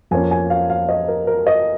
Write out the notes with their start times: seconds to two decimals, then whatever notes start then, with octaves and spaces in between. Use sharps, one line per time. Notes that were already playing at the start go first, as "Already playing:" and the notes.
0.11 F2 F3 A#3 C#4 G#5
0.31 G#5
0.50 F5
0.70 F5
0.89 D#5
1.08 A#4
1.27 A#4
1.47 D#5